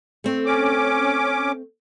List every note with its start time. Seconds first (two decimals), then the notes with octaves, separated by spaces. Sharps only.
0.24 A3 C4
0.46 C#4 D6